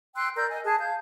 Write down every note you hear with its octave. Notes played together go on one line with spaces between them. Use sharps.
G5 C6 E6 F#6
A#4 D5 E6 G6
D#5 G#5
G#4 A5 F#6
F5 A5 G6